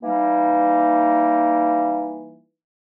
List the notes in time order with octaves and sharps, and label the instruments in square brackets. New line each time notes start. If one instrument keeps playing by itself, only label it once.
[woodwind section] E3 G3 A#3 D#4